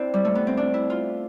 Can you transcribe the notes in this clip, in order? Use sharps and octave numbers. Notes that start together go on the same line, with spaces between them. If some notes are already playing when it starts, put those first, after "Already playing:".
Already playing: C4 D4 E4
G3
A3
B3
C4
D4
E4
F4